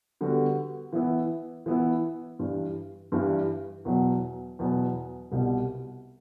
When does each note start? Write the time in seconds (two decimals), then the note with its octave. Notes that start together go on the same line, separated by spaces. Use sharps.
0.21 D3 G3 B3 F#4
0.93 E3 B3 E4
1.66 E3 B3 E4
2.39 G2 E3 G3
3.12 G2 E3 G3
3.85 E2 B2 F#3 B3
4.59 E2 B2 F#3 B3
5.31 C2 B2 G3